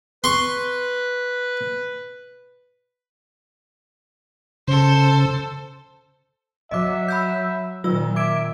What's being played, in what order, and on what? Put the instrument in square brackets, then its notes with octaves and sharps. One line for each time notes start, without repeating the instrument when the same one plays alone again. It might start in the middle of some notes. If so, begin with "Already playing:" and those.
[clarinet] B4 [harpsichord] C6 C#6
[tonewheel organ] C#3 [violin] A4 C5
[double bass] F#3 [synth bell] D#5 D6 [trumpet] E5
[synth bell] B5 E6 G6
[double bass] A#2 D#3 [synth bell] F#3 F4 E6
[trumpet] E5 [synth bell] D6 G#6 D7